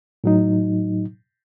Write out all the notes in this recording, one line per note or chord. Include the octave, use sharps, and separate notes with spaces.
A2 F#3 D#4